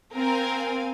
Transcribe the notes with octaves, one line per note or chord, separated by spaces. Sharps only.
C4 A#4 F5 G#5